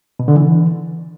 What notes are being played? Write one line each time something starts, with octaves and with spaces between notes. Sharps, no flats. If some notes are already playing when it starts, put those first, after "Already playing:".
B2
D3
E3